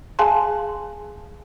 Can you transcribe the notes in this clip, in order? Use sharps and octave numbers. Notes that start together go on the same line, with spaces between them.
G#4 F5 G#5 A5 C6